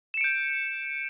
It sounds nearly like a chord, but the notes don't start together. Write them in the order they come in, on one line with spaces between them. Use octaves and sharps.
E7 C#7 D7 G6